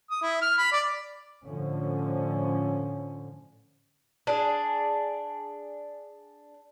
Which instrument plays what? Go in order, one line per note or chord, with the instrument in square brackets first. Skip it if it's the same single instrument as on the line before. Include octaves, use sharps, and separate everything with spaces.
[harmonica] D#6
E4
F6
B5
D5
[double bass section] A2 D3 F3 C#4
[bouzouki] D4 G#4